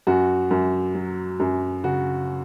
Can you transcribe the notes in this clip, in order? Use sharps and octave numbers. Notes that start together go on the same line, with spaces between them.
F#2 F#4
F#2
F#3
F#2
C#3 F#4